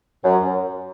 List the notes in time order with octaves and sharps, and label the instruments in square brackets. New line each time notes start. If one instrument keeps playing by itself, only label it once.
[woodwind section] F#2